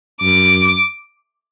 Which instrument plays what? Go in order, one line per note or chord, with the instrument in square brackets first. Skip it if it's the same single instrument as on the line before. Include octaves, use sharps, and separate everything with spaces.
[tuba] F#2 [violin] D6